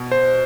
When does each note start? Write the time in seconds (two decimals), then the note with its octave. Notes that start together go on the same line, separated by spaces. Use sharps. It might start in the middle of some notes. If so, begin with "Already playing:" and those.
Already playing: B2
0.12 C5